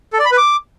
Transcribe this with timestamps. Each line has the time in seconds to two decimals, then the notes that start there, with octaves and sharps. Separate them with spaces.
0.13 A4
0.19 D5
0.25 B5
0.32 B4
0.38 D6